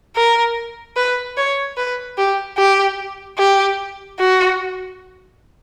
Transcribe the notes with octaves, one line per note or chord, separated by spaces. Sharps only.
A#4
B4
C#5
B4
G4
G4
G4
F#4